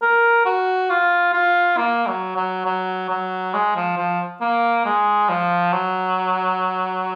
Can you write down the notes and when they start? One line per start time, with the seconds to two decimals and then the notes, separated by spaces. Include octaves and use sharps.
0.02 A#4
0.46 F#4
0.90 F4
1.34 F4
1.78 A#3
2.07 F#3
2.36 F#3
2.66 F#3
3.09 F#3
3.54 G#3
3.76 F3
3.97 F3
4.41 A#3
4.85 G#3
5.29 F3
5.73 F#3